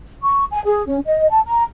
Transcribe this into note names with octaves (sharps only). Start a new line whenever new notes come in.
C#6
G#5
G#4
C#4
D#5
A5
A#5